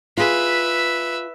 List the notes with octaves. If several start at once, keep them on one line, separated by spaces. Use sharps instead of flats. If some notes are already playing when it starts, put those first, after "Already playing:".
F4 G#4 B4 E5